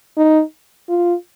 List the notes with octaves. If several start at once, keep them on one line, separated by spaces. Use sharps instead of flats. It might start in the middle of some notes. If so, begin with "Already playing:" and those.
D#4
F4